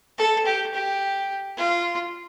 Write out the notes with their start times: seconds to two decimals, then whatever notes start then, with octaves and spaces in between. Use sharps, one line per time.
0.18 A4
0.46 G4
0.74 G4
1.58 F4